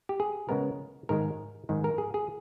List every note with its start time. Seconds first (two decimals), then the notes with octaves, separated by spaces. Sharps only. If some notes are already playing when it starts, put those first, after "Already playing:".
0.09 G4
0.20 G#4
0.49 C#3 G#3 B3 A#4
1.09 G#2 D#3 G#3 A#4
1.69 G#2 D#3 G#3
1.84 A#4
1.98 G#4
2.14 G#4